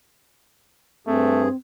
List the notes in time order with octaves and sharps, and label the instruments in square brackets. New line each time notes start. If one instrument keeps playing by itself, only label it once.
[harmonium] G2 G#4 [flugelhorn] A3 [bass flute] C4